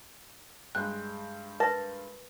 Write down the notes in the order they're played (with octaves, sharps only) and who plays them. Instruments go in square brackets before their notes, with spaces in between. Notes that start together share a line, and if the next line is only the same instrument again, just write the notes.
[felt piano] G2 G#3 G5 [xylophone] F#6
[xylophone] A#4 B4 A#6 [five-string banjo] A5